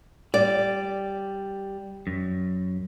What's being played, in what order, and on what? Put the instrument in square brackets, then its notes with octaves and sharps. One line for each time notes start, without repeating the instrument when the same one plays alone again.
[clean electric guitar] G3 [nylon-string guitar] D5
[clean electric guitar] F#2